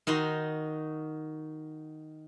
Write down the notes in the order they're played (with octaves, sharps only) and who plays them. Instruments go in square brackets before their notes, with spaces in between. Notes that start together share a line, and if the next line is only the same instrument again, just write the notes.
[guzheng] D#3 D#4 F#4 C6